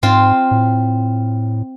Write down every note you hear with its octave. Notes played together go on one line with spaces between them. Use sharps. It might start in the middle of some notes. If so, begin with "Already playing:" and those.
G#2 C4 F4
A2